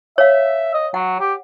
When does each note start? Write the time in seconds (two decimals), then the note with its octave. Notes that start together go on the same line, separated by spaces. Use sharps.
0.18 C#5 E5 F5
0.74 D#5
0.94 F#3 F#5
1.20 G4